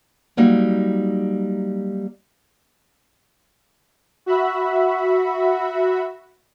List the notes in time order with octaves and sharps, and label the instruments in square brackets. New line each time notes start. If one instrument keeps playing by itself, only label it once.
[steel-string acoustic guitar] F#3 G3 A#3 D#4
[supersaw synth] F#4 E5 B5